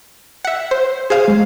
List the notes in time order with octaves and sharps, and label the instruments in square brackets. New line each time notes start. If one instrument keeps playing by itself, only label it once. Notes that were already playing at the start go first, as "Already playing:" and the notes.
[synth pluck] E5 F#5
C5
G#4 C5 F5
[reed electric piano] G#3